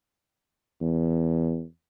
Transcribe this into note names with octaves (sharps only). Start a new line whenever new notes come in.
E2